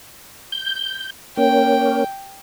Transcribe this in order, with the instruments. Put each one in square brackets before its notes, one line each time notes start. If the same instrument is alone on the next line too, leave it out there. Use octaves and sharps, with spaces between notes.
[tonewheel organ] G6
[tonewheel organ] A#3 C#4 [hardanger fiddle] G5